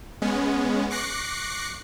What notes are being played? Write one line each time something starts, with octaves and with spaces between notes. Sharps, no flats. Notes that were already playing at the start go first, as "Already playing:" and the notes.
G#3 B3 C#4
C#6 D6 F#6 A#6 C7 C#7